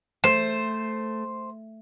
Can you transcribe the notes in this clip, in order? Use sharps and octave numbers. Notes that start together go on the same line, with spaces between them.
A3 C5